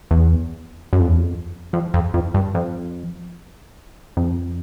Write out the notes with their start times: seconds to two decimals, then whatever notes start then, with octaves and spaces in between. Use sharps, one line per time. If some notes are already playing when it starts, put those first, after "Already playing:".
0.11 E2
0.93 F#2
1.00 F2
1.08 E2
1.17 F2
1.73 F2
1.94 F2
2.14 F2
2.34 G2
2.55 F2
4.17 F2